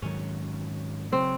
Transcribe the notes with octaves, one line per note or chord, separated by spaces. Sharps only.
G#2 D#3 F#3 C#4
C#3 F#3 C4